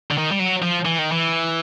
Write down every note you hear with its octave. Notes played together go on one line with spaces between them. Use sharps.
D3
D#3
G3
F#3
F3
E3
D#3
E3